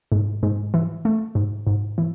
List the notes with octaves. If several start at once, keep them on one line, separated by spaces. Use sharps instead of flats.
G#2
G#2
E3
A3
G#2
G#2
E3